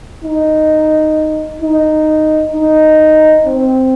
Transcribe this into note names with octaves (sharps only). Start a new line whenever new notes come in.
D#4
D#4
D#4
C4